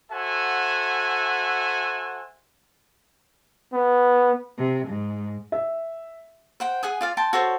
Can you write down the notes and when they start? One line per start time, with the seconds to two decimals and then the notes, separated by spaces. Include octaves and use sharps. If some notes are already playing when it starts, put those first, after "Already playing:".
0.11 F#4 A4 C5 E5 F#5 G#5
3.74 B3
4.57 C3
4.88 G#2
5.52 E5
6.60 C5 F#5 G5
6.83 G#4 F#5 G#5 D#6
7.01 F4 D5 F5
7.17 G5 A5 C6
7.33 F#4 A4 C5 C#5